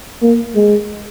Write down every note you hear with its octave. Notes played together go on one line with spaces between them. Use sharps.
A#3
G#3